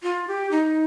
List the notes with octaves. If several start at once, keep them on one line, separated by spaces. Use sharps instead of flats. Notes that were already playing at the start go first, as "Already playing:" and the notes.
F4
G4
D#4